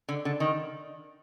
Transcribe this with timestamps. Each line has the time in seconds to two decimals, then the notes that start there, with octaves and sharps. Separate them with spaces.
0.09 D3
0.25 D3
0.40 D#3